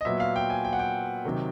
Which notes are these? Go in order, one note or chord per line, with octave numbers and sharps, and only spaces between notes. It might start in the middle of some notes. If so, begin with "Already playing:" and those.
D#5
A#2 F#3 B3 E5
F5
G5
G#5
G5
F#5
G5
C3 D#3 F#3